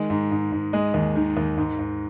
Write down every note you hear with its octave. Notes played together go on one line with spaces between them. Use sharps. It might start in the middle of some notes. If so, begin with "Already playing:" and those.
Already playing: D#3 G#3
G#2
G#2
G#2
G#3 D#5
D#2
D#3
D#2
G#2
G#2